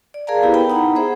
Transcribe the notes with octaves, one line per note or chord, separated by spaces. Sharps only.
D5
G#4 A#4 D5 F5 A5 A#5
B3 E4 G4 B4
B3 G5 A5 B5
D#4 F#5 A#5
B3 G#4 C5 E5